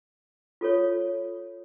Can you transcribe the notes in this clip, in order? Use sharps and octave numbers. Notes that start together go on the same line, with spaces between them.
F4 A4 C#5